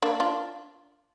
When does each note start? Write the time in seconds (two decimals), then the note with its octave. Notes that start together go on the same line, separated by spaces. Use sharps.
0.02 A#3 D4
0.20 D4 F4